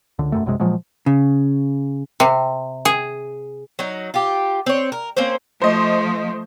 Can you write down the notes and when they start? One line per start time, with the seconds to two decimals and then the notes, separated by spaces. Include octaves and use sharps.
0.19 C#2 D3
0.32 E1 F#2 A3
0.46 B1 F#2 C3 G#3
0.60 A#2 F3 F#3 G#3
1.06 C#3
2.20 C3
2.85 G#4
3.79 F#3 D#4
4.14 F4 G4
4.66 C4 C#5
4.92 A#4
5.17 A#3 C4 C#4 C5
5.62 F3 A3 C5 D#5